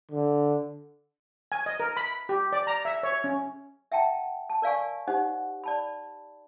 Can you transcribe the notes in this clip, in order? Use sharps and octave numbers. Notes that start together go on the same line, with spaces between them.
D3
G#5
D#5
A#4
B5
G4
D5
A#5
E5
C#5
C#4
E5 F#5 G5 A5 A#5
A5
A#4 D5 F5 G#5 C#6
D#4 G4 C5 D#5 F#5
D5 A5 B5